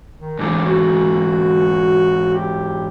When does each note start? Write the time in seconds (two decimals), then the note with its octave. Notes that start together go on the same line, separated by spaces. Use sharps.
0.19 D#3
0.39 G#2 E3 D4
0.66 F#4
2.35 G4